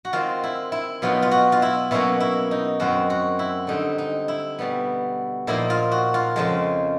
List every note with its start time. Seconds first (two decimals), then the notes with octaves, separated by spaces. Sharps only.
0.05 F#4
0.13 D#3 G#3 C4 F4
0.44 E4
0.72 E4
1.02 B2 F#3 B3 D#4 F4
1.22 F4
1.31 F#4
1.52 F4
1.62 E4
1.91 B2 F#3 A#3 C#4 E4
2.20 E4
2.51 D#4
2.80 F#2 D#3 G#3 C4 D#4 F#4
3.10 F#4
3.39 E4
3.67 D3 G3 C4 D#4
3.98 D#4
4.28 E4
4.59 B2 G3 B3
5.47 A#2 F3 A#3 D#4 E4
5.70 F4
5.92 F#4
6.14 F4
6.36 F2 C#3 F3 G#3